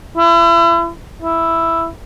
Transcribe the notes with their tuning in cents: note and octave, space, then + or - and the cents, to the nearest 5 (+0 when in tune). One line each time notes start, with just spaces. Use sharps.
E4 +35
E4 +5